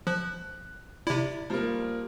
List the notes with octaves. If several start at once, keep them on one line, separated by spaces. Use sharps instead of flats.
F3 F#6
C3 E4 D5
F3 G3 A#3